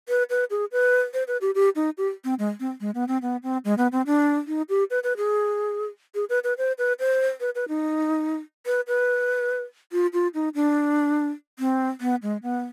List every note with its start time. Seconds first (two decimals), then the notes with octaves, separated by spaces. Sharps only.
0.09 B4
0.30 B4
0.50 G#4
0.72 B4
1.14 C5
1.27 B4
1.41 G4
1.55 G4
1.76 D#4
1.98 G4
2.24 C4
2.39 G#3
2.60 C4
2.81 G#3
2.95 B3
3.08 C4
3.22 B3
3.43 C4
3.65 G#3
3.78 B3
3.92 C4
4.06 D4
4.47 D#4
4.69 G4
4.90 B4
5.03 B4
5.17 G#4
6.15 G#4
6.29 B4
6.44 B4
6.58 C5
6.78 B4
7.00 C5
7.40 B4
7.55 B4
7.68 D#4
8.66 B4
8.88 B4
9.92 F4
10.13 F4
10.34 D#4
10.55 D4
11.59 C4
12.01 B3
12.23 G#3
12.43 B3